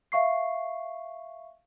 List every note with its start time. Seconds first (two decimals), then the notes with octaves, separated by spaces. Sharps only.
0.12 E5 F5 C#6 C7